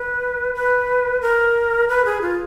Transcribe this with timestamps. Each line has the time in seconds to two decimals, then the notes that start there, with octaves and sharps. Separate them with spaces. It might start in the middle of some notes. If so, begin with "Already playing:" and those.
Already playing: B4
0.55 B4
1.21 A#4
1.88 B4
2.05 G#4
2.21 F4